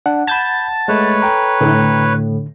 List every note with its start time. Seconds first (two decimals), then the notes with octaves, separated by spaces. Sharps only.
0.06 D4 F#5
0.27 A5 B5 G6 G#6
0.88 G#3 A3 B4 C#5
1.22 A4 G5 A#5
1.61 A2 D3